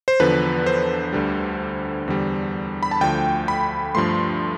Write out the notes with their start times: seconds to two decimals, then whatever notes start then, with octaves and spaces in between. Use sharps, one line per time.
0.08 C5
0.20 E2 D3 F3 B4
0.66 C5
1.13 D2 D3 G3
2.08 E2 D3 G3
2.83 B5
2.91 A5
3.01 D2 D3 F3 A3 G5
3.48 B5
3.95 G2 F3 A3 C6